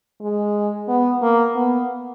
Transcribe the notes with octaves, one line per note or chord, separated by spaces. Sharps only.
G#3
B3
A#3
B3